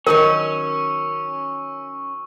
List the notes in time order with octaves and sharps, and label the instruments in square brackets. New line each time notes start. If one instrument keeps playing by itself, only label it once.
[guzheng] D#3 F#3 D#4 [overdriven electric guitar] C#4 [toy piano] A#4 [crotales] C#6 E6